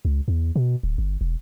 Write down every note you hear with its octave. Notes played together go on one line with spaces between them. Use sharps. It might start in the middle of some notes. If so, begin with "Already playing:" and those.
C#2
E2
B2
D1
G1
E1